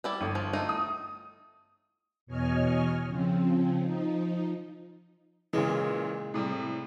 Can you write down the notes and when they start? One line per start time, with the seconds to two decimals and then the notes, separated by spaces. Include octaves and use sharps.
0.04 G3 E4 D5
0.21 G1
0.35 F3
0.53 A3 D#4 F4
0.69 D#6
2.26 E2 B2 C#5 D#5 G#5 F6
3.06 C#3 F3 C4
3.78 F3 D#4
5.53 A#2 C#3 E3 G#3
6.34 A2 C3 G3